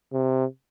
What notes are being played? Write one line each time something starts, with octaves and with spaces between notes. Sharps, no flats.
C3